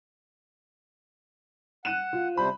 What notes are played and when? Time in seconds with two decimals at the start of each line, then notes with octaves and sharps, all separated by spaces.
1.85 F#5 F#6 D#7 E7
2.13 F4
2.37 C3 G3 C5 B5